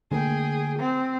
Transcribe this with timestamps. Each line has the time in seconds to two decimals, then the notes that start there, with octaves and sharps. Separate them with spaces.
0.11 D3 A3 A#3 G#4 G5
0.78 C4